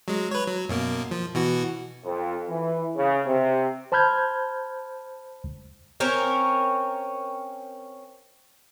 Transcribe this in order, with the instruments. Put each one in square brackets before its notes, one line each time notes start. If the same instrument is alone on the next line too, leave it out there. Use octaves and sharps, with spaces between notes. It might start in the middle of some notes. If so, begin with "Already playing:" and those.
[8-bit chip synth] F#3 G#3
B4 C#5
F#3
F#2 B2 A#3
F3
B2 E3 F#4
[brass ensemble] F2
E3
C#3
C3
[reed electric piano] C5 A5 B5 F6 G6 G#6
[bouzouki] C4 C#4 A#4 C#5